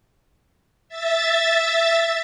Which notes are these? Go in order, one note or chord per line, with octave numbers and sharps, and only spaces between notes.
E5 A6